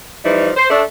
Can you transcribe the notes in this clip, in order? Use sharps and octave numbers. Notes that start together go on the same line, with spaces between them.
E3 F3 G3 D#4 E4
C5
A3 D4